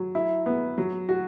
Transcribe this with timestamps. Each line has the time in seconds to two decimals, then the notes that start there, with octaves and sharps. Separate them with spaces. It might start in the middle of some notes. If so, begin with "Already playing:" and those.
Already playing: F#3
0.15 E4
0.46 B3
0.78 F#3
1.09 F#4